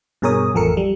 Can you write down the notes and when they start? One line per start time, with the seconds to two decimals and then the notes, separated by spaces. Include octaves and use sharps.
0.22 G2 B2 G#4 A#4 C#5 D#6
0.54 A1 F2 F3 A4 A#4 C#7
0.77 G3